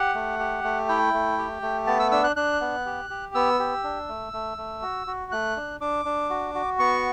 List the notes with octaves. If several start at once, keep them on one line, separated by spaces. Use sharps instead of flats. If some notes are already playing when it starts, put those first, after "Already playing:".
Already playing: G4 F#5
A3
G4
A3
E4 G5
A3
G4
A3
B3 A5
E6
D4 E6
F#6
D4 F#6
B3
G4
G4
B3 E6
G4
D4
A3
A3
A3
F#4
F#4
A3 F#6
D4
D4 D6
D4
F#4
F#4
B3 C#6